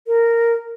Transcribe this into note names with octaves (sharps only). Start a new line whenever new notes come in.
A#4